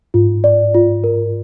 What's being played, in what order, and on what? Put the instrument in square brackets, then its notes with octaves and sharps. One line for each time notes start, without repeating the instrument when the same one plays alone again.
[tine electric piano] G#2 [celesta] F4
[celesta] D5
F4
A#4